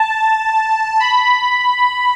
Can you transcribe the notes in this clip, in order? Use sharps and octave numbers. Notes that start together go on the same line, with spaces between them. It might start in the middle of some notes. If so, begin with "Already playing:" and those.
Already playing: A5
B5